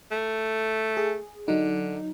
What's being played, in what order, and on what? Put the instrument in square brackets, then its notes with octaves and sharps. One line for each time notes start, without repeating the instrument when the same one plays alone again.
[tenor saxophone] A3
[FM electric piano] G#4
[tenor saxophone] D3 [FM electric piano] F#3 D#4